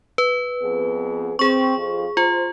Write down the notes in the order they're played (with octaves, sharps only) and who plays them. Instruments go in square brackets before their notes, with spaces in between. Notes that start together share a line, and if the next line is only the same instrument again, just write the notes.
[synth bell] B4
[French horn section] F2 B3 G#4
[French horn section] C4 [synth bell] G#4 C#6
[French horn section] F2 F3
[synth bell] F4 [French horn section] C5